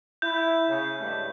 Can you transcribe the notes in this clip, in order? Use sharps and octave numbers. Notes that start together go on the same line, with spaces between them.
E4 G6
C#3
G2 G#3 A3